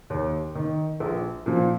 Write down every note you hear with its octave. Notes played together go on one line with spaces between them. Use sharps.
D#2
D#3
A#1
A#2 F3